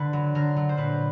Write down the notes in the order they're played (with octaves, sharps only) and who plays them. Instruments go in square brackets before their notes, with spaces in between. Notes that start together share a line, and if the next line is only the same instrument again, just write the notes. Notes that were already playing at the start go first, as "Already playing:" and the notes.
Already playing: [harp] D3 B4
F#3
D3 A#4
F#3
C5
A#2 B4